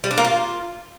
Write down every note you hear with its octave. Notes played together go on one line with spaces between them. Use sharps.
G3
D4
A#3
F4